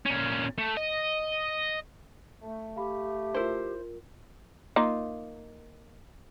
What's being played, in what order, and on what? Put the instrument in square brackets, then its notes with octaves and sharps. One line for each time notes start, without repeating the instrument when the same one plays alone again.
[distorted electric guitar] A#2 C#4
A3
D#5
[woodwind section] A3
[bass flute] G4 [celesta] F5 B5
[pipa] E4 C5 [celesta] F4 A#4
[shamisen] A#3 D#4 F4